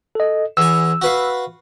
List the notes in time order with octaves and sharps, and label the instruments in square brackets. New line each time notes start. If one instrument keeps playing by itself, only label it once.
[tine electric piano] A4 D#5
[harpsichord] E2 G#5 [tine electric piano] E6
[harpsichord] F#4 B4 F5